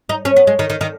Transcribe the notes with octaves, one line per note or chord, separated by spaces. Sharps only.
D#4
C#4
B3
G#3
D#3
D#3
D#3